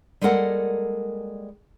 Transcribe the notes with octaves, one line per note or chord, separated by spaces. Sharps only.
G3 G#3 A#3 A4 A#4 F#5